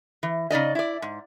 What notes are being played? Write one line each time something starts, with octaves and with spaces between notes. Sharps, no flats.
E3
C#3 D#4 D5 D#5
E4 D5
G#2